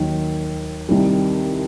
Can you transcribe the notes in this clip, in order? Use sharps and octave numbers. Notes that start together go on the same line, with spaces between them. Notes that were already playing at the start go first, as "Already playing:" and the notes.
Already playing: D#2 D#3 F#3
C2 C3 D#3 G3